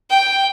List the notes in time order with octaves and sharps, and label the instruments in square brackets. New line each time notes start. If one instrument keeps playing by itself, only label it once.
[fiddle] G5